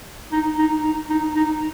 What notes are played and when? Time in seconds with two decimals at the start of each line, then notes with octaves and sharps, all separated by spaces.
0.32 D#4
0.59 D#4
0.83 D#4
1.10 D#4
1.36 D#4